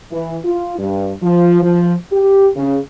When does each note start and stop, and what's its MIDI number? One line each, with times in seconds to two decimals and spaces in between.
0.11 0.37 52
0.45 0.77 65
0.78 1.12 43
1.22 1.61 53
1.62 1.94 53
2.12 2.48 67
2.56 2.79 49